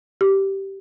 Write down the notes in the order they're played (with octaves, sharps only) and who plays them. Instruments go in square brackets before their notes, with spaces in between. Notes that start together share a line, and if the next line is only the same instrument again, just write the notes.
[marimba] G4